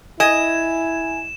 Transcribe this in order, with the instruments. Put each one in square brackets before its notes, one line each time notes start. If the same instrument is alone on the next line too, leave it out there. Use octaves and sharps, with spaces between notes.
[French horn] E4 [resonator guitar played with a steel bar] D#5 [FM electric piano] G#5 G#6 [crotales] E7